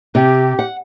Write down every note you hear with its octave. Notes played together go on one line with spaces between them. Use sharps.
C3 G4
F#5